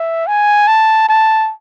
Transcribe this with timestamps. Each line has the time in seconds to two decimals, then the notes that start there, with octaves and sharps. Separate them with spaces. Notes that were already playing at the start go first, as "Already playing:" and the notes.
Already playing: E5
0.27 G#5
0.68 A5
1.09 A5